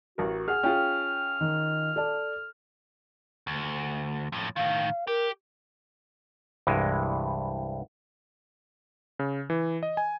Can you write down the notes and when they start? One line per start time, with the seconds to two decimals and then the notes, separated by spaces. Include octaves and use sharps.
0.18 A1 F#4 A#4
0.48 G#4 F#5 F6
0.63 C#4 F4 G#4 G5
1.41 D#3
1.96 A4 D5 A5
3.47 D2
4.32 F2 A2
4.56 A2 D#3 F5
5.07 G4 A#4
6.67 C2 G2 E3 G#3
9.19 C#3
9.50 E3
9.83 D#5
9.97 G#5